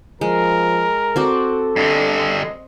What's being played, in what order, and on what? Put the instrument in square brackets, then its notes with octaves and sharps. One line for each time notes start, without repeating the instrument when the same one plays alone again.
[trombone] F3 [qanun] G#3 [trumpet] A#4
[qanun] C4 F#4 D5 [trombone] A4
[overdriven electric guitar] G2 D3 [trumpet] D#5